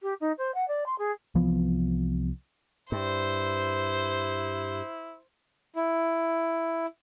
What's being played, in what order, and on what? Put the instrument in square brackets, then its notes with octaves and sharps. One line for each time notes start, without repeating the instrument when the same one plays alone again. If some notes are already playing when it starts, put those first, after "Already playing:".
[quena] G4
D#4
C5
F#5
D5
C6
G#4
[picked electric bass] C2 E3 F3 B3
[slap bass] G2 [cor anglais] E4 [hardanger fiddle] C5
[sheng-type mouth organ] E4